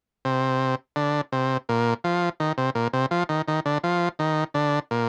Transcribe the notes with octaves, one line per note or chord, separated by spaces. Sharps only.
C3
D3
C3
A#2
F3
D#3
C3
A#2
C3
F3
D#3
D#3
D3
F3
D#3
D3
A#2